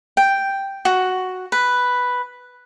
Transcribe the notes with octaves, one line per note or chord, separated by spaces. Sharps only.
G5
F#4
B4